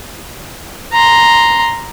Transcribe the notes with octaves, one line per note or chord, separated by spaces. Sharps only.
A#5 C6